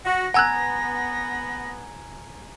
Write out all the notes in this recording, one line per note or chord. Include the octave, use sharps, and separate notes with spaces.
F#4 A#6
B3 F#5 G#5 A#5 E6 F#6 G#6